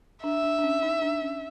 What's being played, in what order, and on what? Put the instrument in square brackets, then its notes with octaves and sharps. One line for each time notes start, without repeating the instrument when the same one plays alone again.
[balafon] D4 [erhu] E5
[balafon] D4
D4
C#4
D#4
D4
C#4